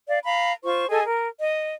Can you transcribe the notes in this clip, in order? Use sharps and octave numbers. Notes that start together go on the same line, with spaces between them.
D5 F5
F5 A#5 B5
F4 C5 C#6
G#4 A4 D#5 G#5
A#4
D#5